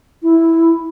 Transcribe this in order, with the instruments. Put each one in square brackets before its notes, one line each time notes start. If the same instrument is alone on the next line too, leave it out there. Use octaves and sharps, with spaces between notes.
[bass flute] E4